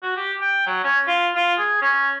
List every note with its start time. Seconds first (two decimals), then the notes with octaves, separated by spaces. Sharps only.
0.03 F#4
0.17 G4
0.41 G5
0.66 F#3
0.84 C#4
1.07 F4
1.35 F4
1.58 G#4
1.82 C#4